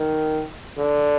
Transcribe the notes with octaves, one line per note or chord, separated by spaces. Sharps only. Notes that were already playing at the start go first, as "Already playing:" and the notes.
Already playing: D#3
D3